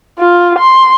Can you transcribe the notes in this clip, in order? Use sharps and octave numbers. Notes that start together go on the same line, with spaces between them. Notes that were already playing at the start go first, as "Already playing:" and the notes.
F4
C6